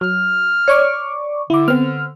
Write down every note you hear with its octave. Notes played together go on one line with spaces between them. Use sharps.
F#3 F6
C#5 D5 C#6 D6
D3 E4 D6
B3 C4 F6